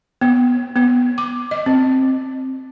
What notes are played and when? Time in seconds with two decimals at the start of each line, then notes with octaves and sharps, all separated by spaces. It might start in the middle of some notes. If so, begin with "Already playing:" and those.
0.21 B3
0.76 B3
1.18 D6
1.51 D#5
1.66 C4